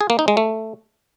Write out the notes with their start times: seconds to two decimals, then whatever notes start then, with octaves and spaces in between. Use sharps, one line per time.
0.01 G#4
0.10 A#3
0.19 D#4
0.28 G#3
0.37 A3